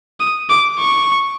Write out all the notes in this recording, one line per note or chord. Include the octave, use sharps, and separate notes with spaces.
D#6
D6
C#6